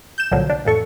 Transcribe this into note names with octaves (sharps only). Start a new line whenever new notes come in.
G6 E7
C2 A#2 D3 F3 F#3
D4
A1 F2 A4 C#6